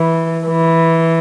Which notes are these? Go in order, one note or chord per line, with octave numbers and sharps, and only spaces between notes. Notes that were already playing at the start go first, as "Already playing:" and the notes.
Already playing: E3
E3